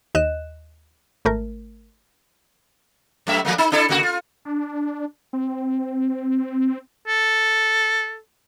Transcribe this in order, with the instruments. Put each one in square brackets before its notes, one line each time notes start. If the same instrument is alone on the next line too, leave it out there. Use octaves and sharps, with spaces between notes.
[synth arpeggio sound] D#2 D#5 F#6 E7
G#1 A3 A#4
[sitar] F#2 A3 E5
F3 A3 A#3
D#4
D4 E4 A4
C#3 A#3 F#4
F4
[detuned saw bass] D4
C4
[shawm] A4